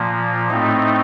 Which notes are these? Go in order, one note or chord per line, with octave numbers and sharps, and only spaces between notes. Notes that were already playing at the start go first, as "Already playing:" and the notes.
Already playing: A#2 F3 A#3
A2 A3 C4 D#4